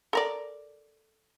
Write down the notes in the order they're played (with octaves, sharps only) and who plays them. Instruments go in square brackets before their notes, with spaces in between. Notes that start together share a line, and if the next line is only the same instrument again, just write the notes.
[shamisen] A4 A#4 D5